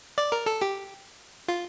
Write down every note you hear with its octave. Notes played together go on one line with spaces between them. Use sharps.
D5
A#4
A4
G4
F4